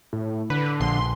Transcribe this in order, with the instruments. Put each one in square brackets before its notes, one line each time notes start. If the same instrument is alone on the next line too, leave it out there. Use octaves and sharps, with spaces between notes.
[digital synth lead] A2
[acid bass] D3 [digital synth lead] B4
[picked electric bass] A#1 [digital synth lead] C6